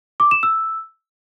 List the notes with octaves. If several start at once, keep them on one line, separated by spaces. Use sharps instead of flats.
D6
E7
E6